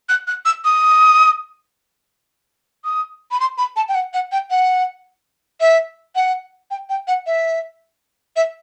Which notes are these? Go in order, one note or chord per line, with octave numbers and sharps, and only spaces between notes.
F#6
F#6
E6
D#6
D#6
B5
C6
B5
A5
G5
F#5
F#5
G5
F#5
E5
F#5
G5
G5
F#5
E5
E5